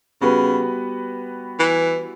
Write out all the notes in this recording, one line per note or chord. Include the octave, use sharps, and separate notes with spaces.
C#3 G3 B3 F#4 B4
E3